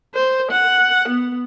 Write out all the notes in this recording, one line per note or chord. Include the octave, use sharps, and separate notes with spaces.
C5
F#5
B3